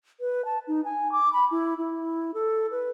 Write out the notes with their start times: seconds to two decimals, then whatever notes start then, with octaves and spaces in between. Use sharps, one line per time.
0.20 B4
0.45 A5
0.68 D#4
0.85 G#5
1.12 D6
1.33 B5
1.51 E4
1.78 E4
2.34 A4
2.71 B4